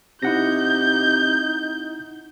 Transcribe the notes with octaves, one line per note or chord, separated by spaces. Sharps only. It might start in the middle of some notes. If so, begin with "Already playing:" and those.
C3 D#4 E4 F#5 G6 A#6